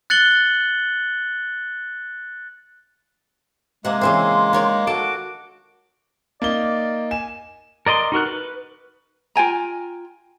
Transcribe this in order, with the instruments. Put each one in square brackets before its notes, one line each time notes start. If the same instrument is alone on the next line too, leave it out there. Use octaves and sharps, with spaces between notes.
[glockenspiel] F#6 A6 C#7 F#7 G7
[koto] C3 F#5 [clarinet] G#3 [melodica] A#3
[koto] C#3 E3 C4 [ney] C6
[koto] D#3 C#5 D5
[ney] F#4 [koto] A4 [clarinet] D6
[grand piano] A#3 D#4 G7 [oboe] D5
[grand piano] G#5 E7
[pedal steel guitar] A#4 D5 D#5 C6
D#4 F#4 A#4 F#6
B4
[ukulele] F4 G5 G#5 A#5